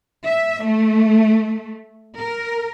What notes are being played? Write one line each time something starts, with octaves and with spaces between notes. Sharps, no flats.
E5
A3
A#4